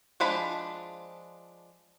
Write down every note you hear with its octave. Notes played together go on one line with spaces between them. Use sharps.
F3 G#3 D4 F5 B5